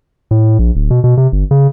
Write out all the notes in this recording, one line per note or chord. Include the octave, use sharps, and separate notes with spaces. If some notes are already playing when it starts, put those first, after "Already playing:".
A2
A#1
D1
B2
B2
C3
G1
C#3